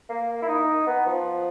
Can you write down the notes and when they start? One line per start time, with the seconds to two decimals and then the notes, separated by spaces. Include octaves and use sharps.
0.09 A#3
0.42 E4
0.48 D#4
0.87 B3
1.06 F3